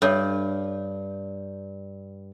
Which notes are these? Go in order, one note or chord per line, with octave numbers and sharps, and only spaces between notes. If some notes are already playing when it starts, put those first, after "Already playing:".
G2 A4 C#5 E5